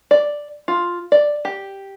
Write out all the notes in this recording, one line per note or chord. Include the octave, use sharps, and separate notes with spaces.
D5
F4
D5
G4